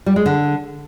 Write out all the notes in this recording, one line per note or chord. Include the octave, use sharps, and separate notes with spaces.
G3
G#3
D3